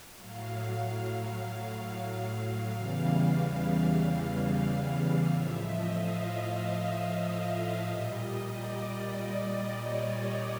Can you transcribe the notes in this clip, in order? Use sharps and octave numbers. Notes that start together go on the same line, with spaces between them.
A2 F#3 F5
E2 C#3 E3 G3 F5
A2 F3 E5
D#5
F5
F5
E5
D#5
A#2 G3
D5
C#5